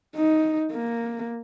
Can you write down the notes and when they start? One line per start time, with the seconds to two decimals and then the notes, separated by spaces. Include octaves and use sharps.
0.16 D#4
0.72 A#3